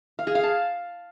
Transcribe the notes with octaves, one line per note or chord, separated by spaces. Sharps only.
F5
G#4
F5
A5